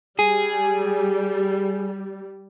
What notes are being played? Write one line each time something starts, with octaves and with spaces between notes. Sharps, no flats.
G3 G#4